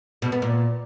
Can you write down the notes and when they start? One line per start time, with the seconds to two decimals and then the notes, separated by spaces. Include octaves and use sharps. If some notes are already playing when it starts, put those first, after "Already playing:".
0.22 B2
0.32 B3
0.42 A#2